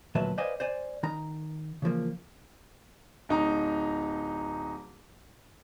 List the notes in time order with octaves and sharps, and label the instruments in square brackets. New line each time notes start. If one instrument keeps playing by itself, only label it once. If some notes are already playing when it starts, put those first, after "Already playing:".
[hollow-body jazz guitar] D2 A#2 F#3 B4 E5 A5
B4 C5 D5 D#5 F5 G#5
C5 D5 G#5
D#3 D#4 A#5
C#3 E3 F3 A#3
[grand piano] D1 D#4 A#5